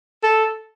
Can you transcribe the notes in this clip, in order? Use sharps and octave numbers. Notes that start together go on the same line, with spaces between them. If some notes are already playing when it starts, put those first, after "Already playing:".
A4